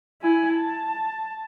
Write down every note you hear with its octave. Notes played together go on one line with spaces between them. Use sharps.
E4 G#5
A5